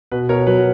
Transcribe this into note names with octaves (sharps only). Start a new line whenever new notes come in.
B2 B4
B2 A#4 C#5
F#3 B4